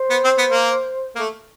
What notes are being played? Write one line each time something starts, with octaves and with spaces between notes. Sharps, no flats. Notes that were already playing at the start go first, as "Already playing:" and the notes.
Already playing: C5
B3
C4
B3
A#3
A#3
A3